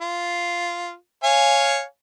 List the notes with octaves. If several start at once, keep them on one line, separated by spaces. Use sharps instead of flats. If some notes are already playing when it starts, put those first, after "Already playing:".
F4
C#5 F5 G#5